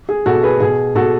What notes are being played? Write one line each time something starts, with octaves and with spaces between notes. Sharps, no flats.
G#4
B2 F#4 A4
G#4 B4
B2 G#4
B2 F#4 A4